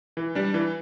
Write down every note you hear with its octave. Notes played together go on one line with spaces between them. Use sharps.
E3
G3 D4
E3